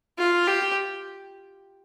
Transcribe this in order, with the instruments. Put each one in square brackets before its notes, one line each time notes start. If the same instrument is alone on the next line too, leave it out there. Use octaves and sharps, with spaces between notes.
[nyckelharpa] F4
G4